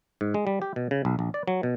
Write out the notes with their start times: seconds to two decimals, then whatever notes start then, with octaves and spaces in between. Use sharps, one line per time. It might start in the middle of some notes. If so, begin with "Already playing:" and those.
0.21 G#2
0.34 G#3
0.47 G3
0.62 G4
0.76 B2
0.91 C#3
1.05 B1
1.19 A#1
1.34 D5
1.48 F#3
1.63 B2